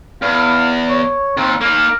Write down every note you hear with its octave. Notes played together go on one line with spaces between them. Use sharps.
E2 F5
C#5
D#2 C4
A#3 D#4 A#4